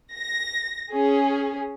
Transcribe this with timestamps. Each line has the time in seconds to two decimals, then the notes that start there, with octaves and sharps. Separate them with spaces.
0.13 A#6
0.92 C#4 G#4